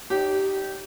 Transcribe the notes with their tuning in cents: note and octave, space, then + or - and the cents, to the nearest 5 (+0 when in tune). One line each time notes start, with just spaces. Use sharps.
D#4 -20 G4 -15 C#5 +10